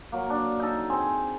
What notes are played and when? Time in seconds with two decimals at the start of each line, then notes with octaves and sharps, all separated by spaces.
0.12 F#3 A#3
0.30 D4
0.60 D#4 A4
0.90 C4 G#4